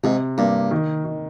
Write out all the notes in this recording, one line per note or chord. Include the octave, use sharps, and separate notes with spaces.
G#2 C3
G2 A#3
D#3
D#3